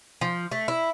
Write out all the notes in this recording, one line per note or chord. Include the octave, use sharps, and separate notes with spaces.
F3
A3
E4